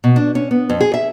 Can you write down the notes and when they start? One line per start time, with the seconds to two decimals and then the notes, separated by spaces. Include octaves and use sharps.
0.04 B2
0.16 D4
0.35 C#4
0.51 B3
0.69 F2
0.81 G#4
0.94 E5